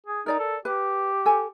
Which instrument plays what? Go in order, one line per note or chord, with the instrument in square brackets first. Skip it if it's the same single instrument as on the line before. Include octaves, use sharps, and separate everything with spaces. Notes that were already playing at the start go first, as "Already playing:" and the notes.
[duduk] G#4
[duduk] D#4 [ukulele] A#4 D5 A#5
[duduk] A4
[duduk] G4 [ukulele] B4
[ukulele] A4 G#5